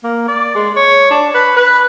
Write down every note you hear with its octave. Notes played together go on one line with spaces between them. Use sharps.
A#3
D5
G#3
C#5
D4
B4
B4